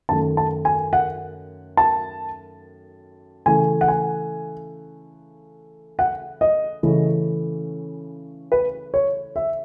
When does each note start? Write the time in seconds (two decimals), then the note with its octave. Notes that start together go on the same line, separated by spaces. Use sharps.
0.09 F#2 D#3 A3 A5
0.37 A5
0.65 G#5
0.93 F#5
1.77 A5
3.46 C#3 E3 A3 G#5
3.81 F#5
3.88 G#5
5.99 F#5
6.41 D#5
6.83 C#3 E3 A3 C#4
8.52 B4
8.94 C#5
9.36 E5